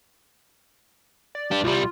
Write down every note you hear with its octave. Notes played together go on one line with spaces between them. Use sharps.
D5
D4 G4
C2 G3 F4